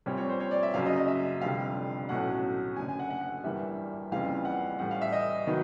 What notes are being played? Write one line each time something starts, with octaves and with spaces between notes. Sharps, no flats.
A#1 A#2 G3 C4 C#5
C#5
C5
C#5
D5
E5
F#1 F#2 C#3 F#3 F5
D#5
D#5
E5
F1 F2 D3 G3 F5
B1 A2 F#3 A3 C#4 F#5
F#1 F#2 D3 G#5
G#5
F#5
F#5
F#5
G1 G2 E3 G3 A#3 E5
F#1 F2 C#3 E3 G3 F5
F#5
A2 E3 G3 F#5
F5
E5
D#5
D#3 F#3 B3 D#4